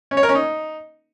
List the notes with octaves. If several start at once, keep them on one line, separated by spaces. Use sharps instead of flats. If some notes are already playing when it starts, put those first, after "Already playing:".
C#4
C#5
A#4
C#4
D#4